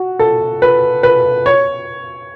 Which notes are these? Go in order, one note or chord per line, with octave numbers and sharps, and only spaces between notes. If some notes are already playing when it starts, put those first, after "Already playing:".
Already playing: F#4
A4
B4
B4
C#5